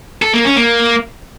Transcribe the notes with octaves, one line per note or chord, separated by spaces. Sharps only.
A4
A#3
C#4
A#3